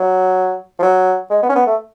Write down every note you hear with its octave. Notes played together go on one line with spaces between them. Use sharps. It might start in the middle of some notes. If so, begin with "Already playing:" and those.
Already playing: F#3
F3
F#3
G#3
B3
C#4
B3
A3